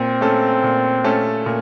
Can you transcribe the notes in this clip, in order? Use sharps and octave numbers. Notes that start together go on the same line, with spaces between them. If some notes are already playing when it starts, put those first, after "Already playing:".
Already playing: A#2 C4
A3 C#4 A4
A#2
A3 C#4 A4
A#2